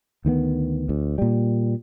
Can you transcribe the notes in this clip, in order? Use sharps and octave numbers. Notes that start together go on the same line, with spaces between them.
D2 D#3 G#3 B3
D2
A#2 G3